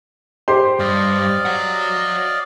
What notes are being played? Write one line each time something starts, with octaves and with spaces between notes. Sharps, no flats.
G4 C5 C6
G2 D5 D#5 F5
C#5 F#5